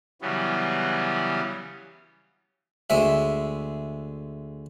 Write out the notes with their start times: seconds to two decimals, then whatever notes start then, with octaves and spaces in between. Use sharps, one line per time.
0.22 C#3 E3 F#3 G3 B3 C#4
2.90 D2 G#3 E5